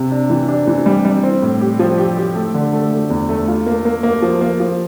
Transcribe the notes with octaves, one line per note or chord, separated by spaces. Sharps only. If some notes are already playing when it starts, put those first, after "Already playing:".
Already playing: C3
D4
E3
D4
E3
G3
G3
C4
A2
G4
F3
G4
G4
A3
D3
A3
A3
E2
A3
F4
A#3
A#3
A#3
F3
A#3
F3